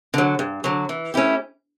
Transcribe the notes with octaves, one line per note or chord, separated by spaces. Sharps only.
D3 F#3
G2
D3 F#3
E3
A3 C#4 E4 G4